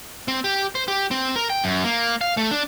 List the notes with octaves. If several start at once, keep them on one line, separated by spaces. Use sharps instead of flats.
C4
G4
C5
G4
C4
A#4
G5
F#2
A#3
F5
A3
D4